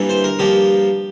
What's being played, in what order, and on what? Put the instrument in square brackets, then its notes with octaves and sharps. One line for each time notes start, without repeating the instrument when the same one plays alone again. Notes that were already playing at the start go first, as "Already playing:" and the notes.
Already playing: [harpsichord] G2 E3 G3 A#3
C5
A#4
G2 F3 A#3 G4